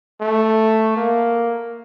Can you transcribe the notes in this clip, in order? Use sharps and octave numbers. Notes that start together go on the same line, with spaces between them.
A3
A#3